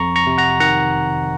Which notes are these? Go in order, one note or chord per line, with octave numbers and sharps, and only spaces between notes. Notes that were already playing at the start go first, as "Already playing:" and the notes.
Already playing: F2 A#5 C#6
A#5 C#6
C3
F#5 A#5
D#3 F#5 A#5